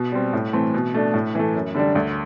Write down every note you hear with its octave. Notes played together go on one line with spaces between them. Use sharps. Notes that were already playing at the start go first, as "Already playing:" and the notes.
Already playing: B2
G3 C4
A2
E3 A3 C4
B2
A3 D4
A2
E3 A3
F#2
D3 G3 D4
D2